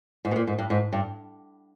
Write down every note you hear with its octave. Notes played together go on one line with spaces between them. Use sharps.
G#2
B2
A#2
G#2
G2
G#2
G2